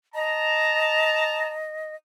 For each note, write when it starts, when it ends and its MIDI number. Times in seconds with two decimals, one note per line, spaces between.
0.15 1.95 75
0.15 1.53 81
0.15 1.53 82